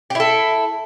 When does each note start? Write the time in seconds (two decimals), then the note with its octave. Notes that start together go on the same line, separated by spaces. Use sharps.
0.10 G4
0.15 E4
0.20 A4